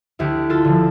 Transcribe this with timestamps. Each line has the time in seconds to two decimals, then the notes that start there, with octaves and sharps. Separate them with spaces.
0.19 D2 E4 G4
0.50 F4 A4
0.64 D3 F3